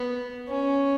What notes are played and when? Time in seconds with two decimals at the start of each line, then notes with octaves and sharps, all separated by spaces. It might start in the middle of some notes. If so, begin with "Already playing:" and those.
Already playing: B3
0.48 C#4